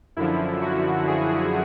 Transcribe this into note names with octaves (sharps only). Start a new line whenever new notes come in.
F#2 D3 F3 E4
F#4
G#4